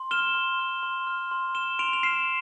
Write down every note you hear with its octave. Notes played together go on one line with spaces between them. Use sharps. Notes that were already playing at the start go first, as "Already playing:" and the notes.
Already playing: C6
F6 E7 G7
C6
F6
C6
F6
C6
F6 E7 G7
C6 D7 F7
F7
F6 C7 E7